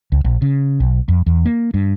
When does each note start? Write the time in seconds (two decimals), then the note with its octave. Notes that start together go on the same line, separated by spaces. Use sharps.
0.12 C#2
0.24 A#1
0.42 C#3
0.80 B1
1.08 F2
1.26 E2
1.46 A#3
1.74 G2